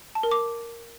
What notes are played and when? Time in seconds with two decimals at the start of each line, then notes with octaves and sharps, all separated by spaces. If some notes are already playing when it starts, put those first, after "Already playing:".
0.15 A5
0.23 A#4
0.31 D6